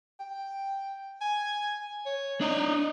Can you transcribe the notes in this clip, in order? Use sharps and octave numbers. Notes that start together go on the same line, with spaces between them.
G5
G#5
C#5
D4 D#4 D#5